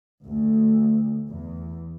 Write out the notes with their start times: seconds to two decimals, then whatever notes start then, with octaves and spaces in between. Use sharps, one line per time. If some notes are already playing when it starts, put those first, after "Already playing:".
0.24 D2
1.29 E2